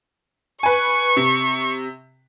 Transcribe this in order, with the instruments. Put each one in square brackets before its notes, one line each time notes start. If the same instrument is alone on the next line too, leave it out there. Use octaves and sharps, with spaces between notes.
[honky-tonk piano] B4 G#5 [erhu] C#6
[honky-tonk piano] C3